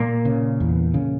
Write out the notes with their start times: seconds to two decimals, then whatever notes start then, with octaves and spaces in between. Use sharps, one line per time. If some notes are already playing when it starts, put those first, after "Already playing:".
Already playing: A#2 A#3
0.25 C#3
0.60 E2
0.94 C#3